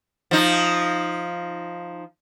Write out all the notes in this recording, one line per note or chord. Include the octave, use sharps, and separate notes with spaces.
F3 D#4